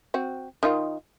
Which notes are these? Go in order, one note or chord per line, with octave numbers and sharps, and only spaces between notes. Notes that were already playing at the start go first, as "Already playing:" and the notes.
C4 F#4
D#3 D#4 F4